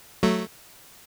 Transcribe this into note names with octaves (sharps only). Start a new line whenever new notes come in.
F#3 A3